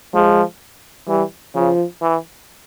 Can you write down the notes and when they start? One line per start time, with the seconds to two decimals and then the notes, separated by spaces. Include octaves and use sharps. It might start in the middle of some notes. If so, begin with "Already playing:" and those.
0.14 F3 G#3
1.08 E3 G3
1.55 C#3 F3
2.02 E3